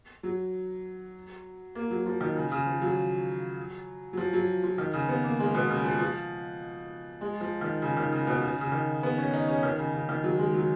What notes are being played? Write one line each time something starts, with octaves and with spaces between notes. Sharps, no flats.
F#3
A#3
F#3
F3
D#3
C#3
C#3
F3
F#3
F#3
F3
F#3
F3
D#3
C#3
B3
A#3
G#3
B2
C#3
F3
F3
G#3
F3
D#3
C#3
D#3
C#3
B2
C#3
C#3
D#3
B3
C#4
D#4
C#4
D#3
C#3
C#3
D#3
F#3
G#3
F#3